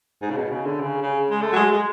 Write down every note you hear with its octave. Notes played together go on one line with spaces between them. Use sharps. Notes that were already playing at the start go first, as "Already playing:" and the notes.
G#2
C#3
B2
C#3
D3
C#3
C#3
G#3
A3
F#3
G#3
G#3